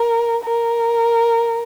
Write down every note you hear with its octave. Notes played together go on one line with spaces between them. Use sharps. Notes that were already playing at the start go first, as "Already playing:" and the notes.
Already playing: A#4
A#4